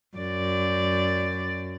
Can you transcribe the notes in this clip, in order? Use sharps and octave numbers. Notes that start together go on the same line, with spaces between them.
F#2 D5